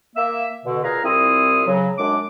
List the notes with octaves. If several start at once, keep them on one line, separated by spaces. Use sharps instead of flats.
A#3 E5 E6
B2 D3
A#2 G#4 B4 F5 A#5
C2 C4 E4 F4 E5 D#6
C#3 F#3
F#2 G#3 D4 D6